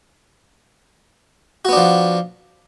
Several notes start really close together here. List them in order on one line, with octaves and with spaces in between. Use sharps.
F#4 B3 D4 F3